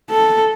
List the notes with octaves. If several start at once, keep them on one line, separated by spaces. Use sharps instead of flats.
A4